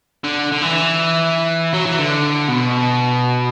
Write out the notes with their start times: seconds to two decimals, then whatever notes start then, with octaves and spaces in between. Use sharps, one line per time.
0.24 D3
0.52 D3
0.62 E3
1.74 F#3
1.86 E3
1.99 D3
2.49 B2